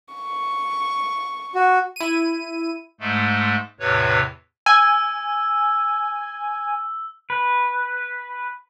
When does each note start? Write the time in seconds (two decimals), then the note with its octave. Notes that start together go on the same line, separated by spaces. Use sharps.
0.14 C#6
1.55 F#4
1.96 E4 D#7
3.00 G#2 G#3 A3
3.80 E2 A2 C3 B4 C#5
4.66 G#5 E6
7.30 B4